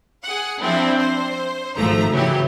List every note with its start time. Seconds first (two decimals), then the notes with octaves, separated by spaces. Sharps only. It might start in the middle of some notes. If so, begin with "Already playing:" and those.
0.23 G#4 F#5
0.61 F3 C4 D4 E4
0.98 C5
1.77 G#1 F3 A3 A#5
2.12 C#3 E3 F#3 E4 G4